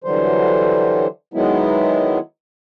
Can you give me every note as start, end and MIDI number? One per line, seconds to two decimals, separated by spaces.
0.04 1.07 50
0.04 1.07 52
0.04 1.07 54
0.04 1.07 55
0.04 1.07 72
1.34 2.19 51
1.34 2.19 54
1.34 2.19 56
1.34 2.19 59
1.34 2.19 64